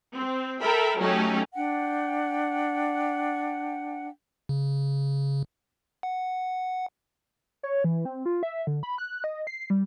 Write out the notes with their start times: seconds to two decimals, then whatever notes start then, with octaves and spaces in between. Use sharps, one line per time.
0.16 C4
0.61 A4 A#4 E5 G5 B5
0.99 F#3 A3 C#4 D#4 G4
1.54 D4 F#5 G5
4.49 C#3
6.03 F#5
7.63 C#5
7.84 E3
8.05 C4
8.26 F4
8.43 E5
8.67 D3
8.83 B5
8.98 F#6
9.24 D#5
9.47 C7
9.70 G3